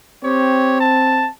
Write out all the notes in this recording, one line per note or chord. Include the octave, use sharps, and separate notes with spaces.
C4 G4 C#5
A5